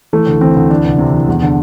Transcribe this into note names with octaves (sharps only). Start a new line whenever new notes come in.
E3 A3
D2
E3 C4
D2
E3 D4
C2
C3
E3
E2
D3